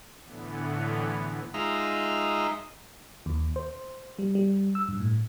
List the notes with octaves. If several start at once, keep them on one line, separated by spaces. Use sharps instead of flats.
A2 D3 E3 B3
G#3 D#4 F4 E5 A#5
D#2
C5
G3
G3
E6
G2
A2